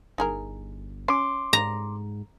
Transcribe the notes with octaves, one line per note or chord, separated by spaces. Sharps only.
G1 D#4 G#4 A#4
C#4 C6 D6
G#2 A#5